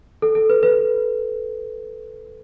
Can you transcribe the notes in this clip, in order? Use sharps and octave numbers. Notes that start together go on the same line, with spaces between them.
A4
A4
B4
B4